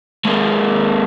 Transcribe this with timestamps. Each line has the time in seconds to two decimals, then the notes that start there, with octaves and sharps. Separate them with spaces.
0.25 G#3 A#3